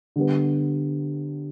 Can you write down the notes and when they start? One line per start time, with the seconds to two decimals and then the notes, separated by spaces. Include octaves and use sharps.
0.16 D3 G3 B3